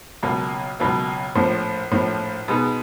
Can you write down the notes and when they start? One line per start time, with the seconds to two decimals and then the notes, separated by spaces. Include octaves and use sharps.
0.23 C#2 B2 F#3 A#3
0.80 C#2 B2 F#3 A#3
1.36 A#1 A2 F3
1.92 A#1 A2 F3
2.48 B2 G#3 B3 D#4